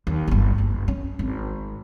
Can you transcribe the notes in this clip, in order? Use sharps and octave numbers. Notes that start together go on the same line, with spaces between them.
D#2
D1 G1
F#1
C#4
G#1